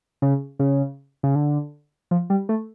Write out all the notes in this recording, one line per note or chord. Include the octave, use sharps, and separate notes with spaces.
C#3
C#3
C#3
D3
F3
G3
A3